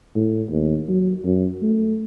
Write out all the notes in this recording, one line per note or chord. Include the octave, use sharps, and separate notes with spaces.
A2
D#2
F#3
F#2
A3